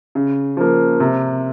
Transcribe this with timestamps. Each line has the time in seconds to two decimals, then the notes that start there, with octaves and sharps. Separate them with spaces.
0.15 C#3
0.57 F3 A#3
1.00 C3